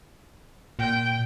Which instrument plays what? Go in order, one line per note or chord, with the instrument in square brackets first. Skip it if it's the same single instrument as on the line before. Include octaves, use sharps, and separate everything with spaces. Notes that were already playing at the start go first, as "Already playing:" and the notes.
[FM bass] A#2 [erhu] G5